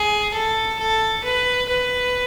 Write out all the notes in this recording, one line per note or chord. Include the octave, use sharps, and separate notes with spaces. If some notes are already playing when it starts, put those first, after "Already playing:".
Already playing: G#4
A4
A4
B4
B4